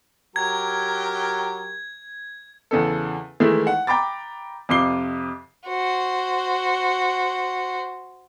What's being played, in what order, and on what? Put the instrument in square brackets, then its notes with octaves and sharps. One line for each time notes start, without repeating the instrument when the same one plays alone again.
[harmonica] F#3 G4 A#4 [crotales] G#6
[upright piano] E2 C#3 A4
D#3 E3 G#3 A3 E4
F#5
G5 A#5 B5 D6 A6
F2 C3 F4 D6 C7 G7
[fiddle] F#4 C5